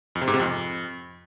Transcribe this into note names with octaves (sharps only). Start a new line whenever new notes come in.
F2
C3
G#2
C3
F2